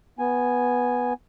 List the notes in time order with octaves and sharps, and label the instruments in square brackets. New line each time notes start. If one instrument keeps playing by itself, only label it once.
[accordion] B3 G#5